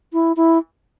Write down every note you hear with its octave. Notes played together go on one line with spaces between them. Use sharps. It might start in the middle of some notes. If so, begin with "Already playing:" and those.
E4
E4